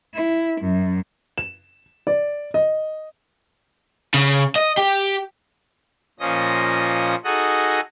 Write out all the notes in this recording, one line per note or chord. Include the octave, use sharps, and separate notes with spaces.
E4
F#2
E7
D5
D#5
C#3
D#5
G4
A#2 F3 C#4 D#5 A#6
D#4 F#4 G#4 A4 D#5 F#5